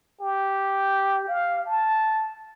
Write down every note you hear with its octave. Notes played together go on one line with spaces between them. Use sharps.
G4
F5
A5